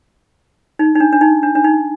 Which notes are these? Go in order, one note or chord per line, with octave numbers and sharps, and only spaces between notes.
D#4
D#4
D4
D4
D#4
D4
D4
D#4